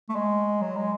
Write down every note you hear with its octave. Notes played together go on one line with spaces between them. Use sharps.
A3
G#3
F#3
G#3